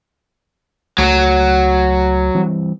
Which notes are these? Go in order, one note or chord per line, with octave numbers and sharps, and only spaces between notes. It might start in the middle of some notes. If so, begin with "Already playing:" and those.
C#2 F#3 A3
E3 G3 C4